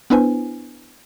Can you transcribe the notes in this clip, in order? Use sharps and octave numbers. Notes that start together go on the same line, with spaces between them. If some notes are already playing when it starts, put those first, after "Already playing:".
B3 D4 E4 B4 C5 G#5